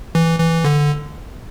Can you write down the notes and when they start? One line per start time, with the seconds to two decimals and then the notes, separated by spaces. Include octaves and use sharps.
0.15 E3
0.39 E3
0.65 D3